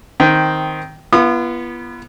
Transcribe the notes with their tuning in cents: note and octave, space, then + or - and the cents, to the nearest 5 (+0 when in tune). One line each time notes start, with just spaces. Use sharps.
D#3 +0 C4 -5
B3 -20 F4 -45 D#6 -40